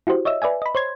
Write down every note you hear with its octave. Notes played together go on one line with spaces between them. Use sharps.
E4 F#4 G4 C5
C#5 D#5 E5 E6
B4 D5 E5 G#5
D#5 B5
C5 C#5 C6 G#6